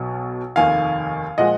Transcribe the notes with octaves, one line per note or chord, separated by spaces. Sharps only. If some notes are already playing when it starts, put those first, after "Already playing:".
Already playing: B1 B2 F#3
F1 D#2 D#3 F5 G#5
A#2 F3 G#3 D#5 F#5